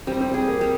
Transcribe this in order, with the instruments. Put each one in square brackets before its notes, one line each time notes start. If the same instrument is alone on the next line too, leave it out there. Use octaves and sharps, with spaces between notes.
[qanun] G3 [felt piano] C4
[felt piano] C4
[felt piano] C4 [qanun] G#4
[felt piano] A#3
[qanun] G3